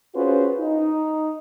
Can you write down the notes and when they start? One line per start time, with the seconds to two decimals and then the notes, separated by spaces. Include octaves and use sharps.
0.15 C#4 F4 F#4 G#4 B4 C5
0.59 D#4